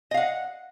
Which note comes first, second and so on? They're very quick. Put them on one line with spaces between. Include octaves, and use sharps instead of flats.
D#5 F5 F#5